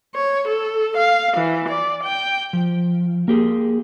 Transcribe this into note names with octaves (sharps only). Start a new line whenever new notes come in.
C#5
A4
F5
E3
D5
G5
F3
A#3 G4 G#4